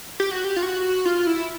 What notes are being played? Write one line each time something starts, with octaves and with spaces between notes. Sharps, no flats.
G4
F#4
G4
F4
F#4
F4
E4